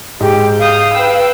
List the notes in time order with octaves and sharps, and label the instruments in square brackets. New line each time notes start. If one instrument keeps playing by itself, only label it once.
[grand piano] G#2 G#3 [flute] G4
[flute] F5 [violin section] D#6 G6
[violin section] B4 G5 E6